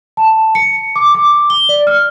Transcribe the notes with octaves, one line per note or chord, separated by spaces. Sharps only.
A5
C#7
D6
D6
G7
D5
F6